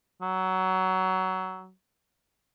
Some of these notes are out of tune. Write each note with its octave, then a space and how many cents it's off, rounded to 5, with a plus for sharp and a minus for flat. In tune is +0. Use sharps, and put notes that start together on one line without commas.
F#3 +15